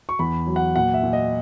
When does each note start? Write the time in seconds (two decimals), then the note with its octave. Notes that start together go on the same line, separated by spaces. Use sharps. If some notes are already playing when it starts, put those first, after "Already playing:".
0.09 C#6
0.19 E2 B5
0.47 F#3
0.56 F#5
0.76 A#2 F#5
0.94 E5
1.03 A#2
1.13 D#5